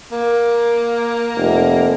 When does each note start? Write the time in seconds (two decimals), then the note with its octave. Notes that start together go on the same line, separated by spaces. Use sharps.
0.12 A#3
1.37 F1